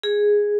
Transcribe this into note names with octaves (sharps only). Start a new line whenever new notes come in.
G#4